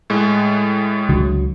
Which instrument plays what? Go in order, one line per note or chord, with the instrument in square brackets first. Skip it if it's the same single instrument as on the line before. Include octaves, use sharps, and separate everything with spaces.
[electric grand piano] A2 G#3
[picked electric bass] C#2 D3 F#3